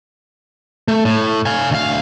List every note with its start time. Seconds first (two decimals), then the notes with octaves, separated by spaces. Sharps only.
0.88 A3
1.05 A2
1.46 F5 G#5
1.71 D2 F5